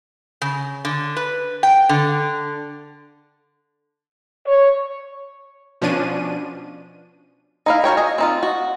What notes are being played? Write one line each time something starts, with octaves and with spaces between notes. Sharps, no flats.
C#3
D3
B4
G5
D3
C#5
B2 F3 C#4 D4 D#7
D#4 E4 F5
F#4 A#4 C#5 G5
D#5 G#5 A#5
C4 D#4 F4
F#4